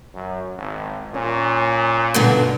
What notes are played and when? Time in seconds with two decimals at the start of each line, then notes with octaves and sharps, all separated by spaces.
0.14 F#2
0.58 G#1
1.14 A#2 C#4
2.14 G2 B2 D3